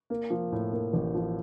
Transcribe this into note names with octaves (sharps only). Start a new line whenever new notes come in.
A#3
F3
A2
A#3
A1
F3